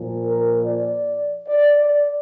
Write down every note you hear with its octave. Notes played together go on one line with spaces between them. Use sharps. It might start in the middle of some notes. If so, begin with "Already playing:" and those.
Already playing: A#2 F3
A#4
D5
D5
D5